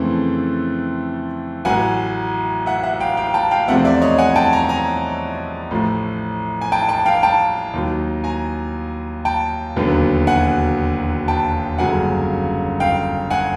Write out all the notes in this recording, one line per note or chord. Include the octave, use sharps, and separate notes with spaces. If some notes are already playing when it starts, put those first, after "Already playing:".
Already playing: F2 C#3 E3 A3 C4
A1 A2 F#3 F#5 G#5
E5 F#5
E5 F#5
F5 G5
F5 G5
G5 A5
F5 G5
E2 C3 F3 A3 C4 E5 F#5
D5 E5
C#5 D#5
F#5 G#5
G5 A5
G#5 A#5
G#5 A#5
A1 A2 F3 A3
G#5
G5 A5
G5 A5
F5 G5
G5 A5
D#2 D#3 F#3
G#5 A#5
G5 A5
E1 D#2 D3 F#3 B3
F#5 G#5
G5 A5
G1 F#2 C#3 F#3 A#3 F#5 G#5
F5 G5
F#5 G#5